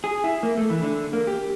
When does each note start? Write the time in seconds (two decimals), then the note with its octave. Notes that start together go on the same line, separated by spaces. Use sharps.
0.04 G#4
0.24 E4
0.43 A#3
0.57 A3
0.70 E3
0.82 D3
1.13 A#3
1.27 G4